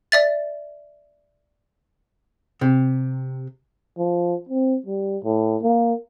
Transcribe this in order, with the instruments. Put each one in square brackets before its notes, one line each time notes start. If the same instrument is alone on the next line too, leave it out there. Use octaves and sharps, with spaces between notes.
[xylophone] D5 E5 A6
[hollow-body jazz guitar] C3
[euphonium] F3
C4
G3
A2
A#3